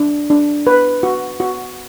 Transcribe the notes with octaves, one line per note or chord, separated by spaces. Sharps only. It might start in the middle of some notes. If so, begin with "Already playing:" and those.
Already playing: D4
D4
B4
F#4
F#4